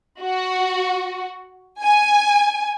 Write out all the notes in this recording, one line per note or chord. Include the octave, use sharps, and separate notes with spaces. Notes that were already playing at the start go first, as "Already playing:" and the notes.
F#4
G#5